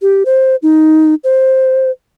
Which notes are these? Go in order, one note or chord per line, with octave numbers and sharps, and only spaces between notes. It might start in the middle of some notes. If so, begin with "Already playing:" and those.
G4
C5
D#4
C5